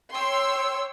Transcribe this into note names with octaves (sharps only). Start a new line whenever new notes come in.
C#5 G5 C6 E6